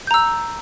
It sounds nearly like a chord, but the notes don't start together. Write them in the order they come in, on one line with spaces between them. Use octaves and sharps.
G6 A#5 E6